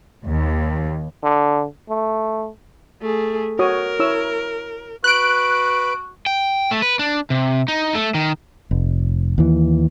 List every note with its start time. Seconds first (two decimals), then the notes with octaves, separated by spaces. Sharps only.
0.24 D#2
1.23 D3
1.89 A3
3.02 A3 G#4
3.59 F#4 A#4 C#5 D#6
3.99 E4 C#5 E6
5.04 F#4 B4 F#6 D7
6.26 G5
6.71 A3
6.82 B4
6.99 D4
7.30 C3
7.68 D#4
7.95 A3
8.14 D#3
8.71 F1
9.38 D#2 E3